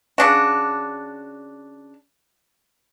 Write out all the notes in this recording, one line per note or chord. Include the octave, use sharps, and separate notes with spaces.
C#3 D4 F#4